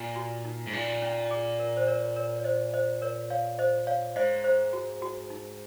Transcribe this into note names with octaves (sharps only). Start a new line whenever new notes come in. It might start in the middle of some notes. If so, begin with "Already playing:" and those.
Already playing: A#2
F#4
D#4
G#2
A#2 D#4
C#4
G#4
A#4
C5
A#4 C#5
A#4 C#5
C#5
C5 D#5
C5 D#5
A#4 C#5
C#5 F5
C5 D#5
C#5 F5
G#2 C5 D#5
C5
F#4
F#4
D#4